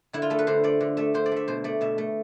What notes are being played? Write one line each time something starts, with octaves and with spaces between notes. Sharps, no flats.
D3 E4
F4
A3 A4
B4
D3 C5
A3 D5
D3
A3 E5
D3 C5
D5
A3 E5
B2 C5
A3 D5
B2 E5
A3